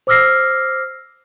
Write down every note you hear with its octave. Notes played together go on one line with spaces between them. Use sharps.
C5 D6 E6 F6 A#6 C7